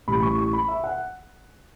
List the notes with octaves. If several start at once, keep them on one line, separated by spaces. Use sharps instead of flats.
A1 A2 E3 G3 B5
C#6
C#6
B5
E5
F#5